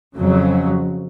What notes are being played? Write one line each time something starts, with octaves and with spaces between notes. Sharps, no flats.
F2 C#3 F#3